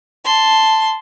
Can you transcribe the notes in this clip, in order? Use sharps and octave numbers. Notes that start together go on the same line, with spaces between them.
A5 C6